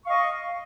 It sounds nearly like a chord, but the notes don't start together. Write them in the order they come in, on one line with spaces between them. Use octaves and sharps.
C#6 F5 D#5